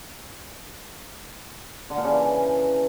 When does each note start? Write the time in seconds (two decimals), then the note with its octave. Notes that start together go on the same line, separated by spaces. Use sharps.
1.90 D3
1.97 A#2
2.04 C#3
2.11 E3